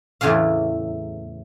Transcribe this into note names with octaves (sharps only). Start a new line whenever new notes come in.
E2 A2 C#3 A3 F5